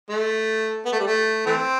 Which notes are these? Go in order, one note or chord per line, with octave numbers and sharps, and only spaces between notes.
A3
B3
A3
G3
A3
E3 A3 C4